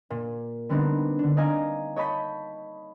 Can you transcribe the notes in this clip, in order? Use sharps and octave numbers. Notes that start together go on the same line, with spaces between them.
A#2
D3 G3 B3 C4 D4 D#4
D3 D4
D5 D#5 F5 G#5 A#5
C#5 D#5 A5 B5 G6 B6